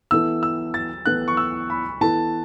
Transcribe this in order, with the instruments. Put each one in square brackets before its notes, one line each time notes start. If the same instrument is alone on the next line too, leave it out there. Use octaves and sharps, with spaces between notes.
[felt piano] E3 B3 E4 A4 [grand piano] E6
[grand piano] E6
A6
[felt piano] E3 B3 E4 A4 [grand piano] F#6
[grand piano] C#6
E6
B5
[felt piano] E3 B3 E4 A4 [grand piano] A5